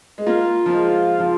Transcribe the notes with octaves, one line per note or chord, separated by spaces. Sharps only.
G#3
A#3 F4
F3
G#3
F3